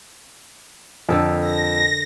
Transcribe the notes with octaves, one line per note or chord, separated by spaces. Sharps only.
F2 D3 A4 A#4
A#6